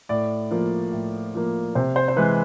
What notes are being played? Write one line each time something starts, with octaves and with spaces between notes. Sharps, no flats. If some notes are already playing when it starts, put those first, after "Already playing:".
A2 D5
F3 A#3
A2
F3 A#3
C3 C5
C5
C5
E3 G#3 B4